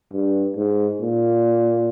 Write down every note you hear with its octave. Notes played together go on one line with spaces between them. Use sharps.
G2
G#2
A#2